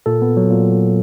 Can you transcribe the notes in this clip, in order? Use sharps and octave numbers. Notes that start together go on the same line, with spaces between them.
A#2 A4
B3
F#3
A#2